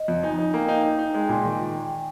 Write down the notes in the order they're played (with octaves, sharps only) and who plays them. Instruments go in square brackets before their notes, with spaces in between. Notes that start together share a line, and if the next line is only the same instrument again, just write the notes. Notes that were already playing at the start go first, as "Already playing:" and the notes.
Already playing: [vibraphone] D#5
[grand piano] F2
[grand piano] D#4 [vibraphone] G#5
[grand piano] D#4
[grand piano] A#3 [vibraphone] G5
[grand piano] D#4 [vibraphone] F5
[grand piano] D#4 [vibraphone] G5
[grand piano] D#4
[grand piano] G#3 [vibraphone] G#5
[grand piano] A#2 [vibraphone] G#5
[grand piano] D#3